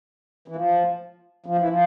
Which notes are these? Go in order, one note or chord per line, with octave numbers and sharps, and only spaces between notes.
E3
F3
F3
E3
F3